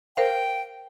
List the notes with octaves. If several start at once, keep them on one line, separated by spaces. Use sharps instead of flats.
A#4 C5 F5 G5